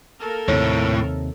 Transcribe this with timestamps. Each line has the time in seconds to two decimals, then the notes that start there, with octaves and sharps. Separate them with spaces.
0.19 A#3 A4 A#4
0.48 D#2 A2 C3 C#5